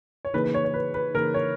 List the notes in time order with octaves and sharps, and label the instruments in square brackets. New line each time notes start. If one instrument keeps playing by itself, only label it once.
[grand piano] C#5
[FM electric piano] C#3 E3 A#3 D#4 G#4 [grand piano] B4
[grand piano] B4
C#5
C#5
B4
B4
[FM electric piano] C#3 E3 A#3 D#4 G#4 [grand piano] A#4
[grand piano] C#5